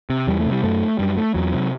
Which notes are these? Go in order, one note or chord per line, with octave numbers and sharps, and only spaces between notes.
C3
E2 G3
A3
C3
G3
F#2 A3
F#2 G3
A3
E2 F#3
C3